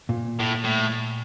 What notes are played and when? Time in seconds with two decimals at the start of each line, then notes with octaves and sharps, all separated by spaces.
0.09 A#2
0.40 A2
0.65 A2